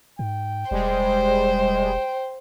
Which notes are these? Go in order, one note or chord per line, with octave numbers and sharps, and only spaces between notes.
G#2 G5
E1 G3 G#3 C5